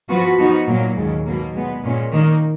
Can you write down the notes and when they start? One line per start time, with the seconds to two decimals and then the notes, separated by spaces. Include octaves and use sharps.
0.09 F3 B3 F#4 B4
0.38 F3 B3 D#4 F#4
0.68 A#2 F#3 A#3
0.96 D#2 C#3 G#3
1.25 B2 F#3 A#3
1.55 A#2 G#3 B3
1.83 A#2 G#3 C#4
2.12 D#3 A#3 D#4